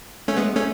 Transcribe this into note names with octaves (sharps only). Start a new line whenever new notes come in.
A3 C#4
G#3 B3
A3 C#4